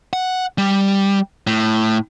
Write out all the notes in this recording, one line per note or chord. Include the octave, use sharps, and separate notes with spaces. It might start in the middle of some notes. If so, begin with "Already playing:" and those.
F#5
G3
A2